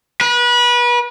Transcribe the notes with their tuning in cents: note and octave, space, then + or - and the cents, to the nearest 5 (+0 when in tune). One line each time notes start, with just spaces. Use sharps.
B4 -30